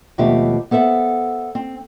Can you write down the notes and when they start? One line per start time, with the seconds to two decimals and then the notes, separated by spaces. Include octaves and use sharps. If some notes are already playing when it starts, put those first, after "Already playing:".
0.18 D#2 B2 F3 A3 G4 E5
0.71 B3 A4 C5 E5 F#5
1.55 C4